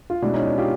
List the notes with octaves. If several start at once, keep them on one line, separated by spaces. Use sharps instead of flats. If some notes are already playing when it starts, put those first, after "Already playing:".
F4
B2 G#3 D4 E4
C#4 D#4
D4
F4 G4